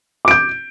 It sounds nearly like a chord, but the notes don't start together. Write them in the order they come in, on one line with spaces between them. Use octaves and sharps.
D6 D7 G6